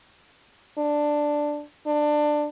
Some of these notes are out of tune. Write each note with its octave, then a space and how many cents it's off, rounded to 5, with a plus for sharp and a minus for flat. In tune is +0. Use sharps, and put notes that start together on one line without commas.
D4 +5
D4 +20